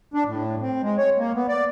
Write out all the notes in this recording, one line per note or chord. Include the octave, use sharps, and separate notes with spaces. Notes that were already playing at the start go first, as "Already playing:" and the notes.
D4
A2
C4
G#3
C#5
A#3
B3
D5